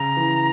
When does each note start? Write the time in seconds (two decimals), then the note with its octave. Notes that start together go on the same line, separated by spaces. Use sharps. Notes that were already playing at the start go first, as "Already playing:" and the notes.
Already playing: C#3 A#5
0.17 E3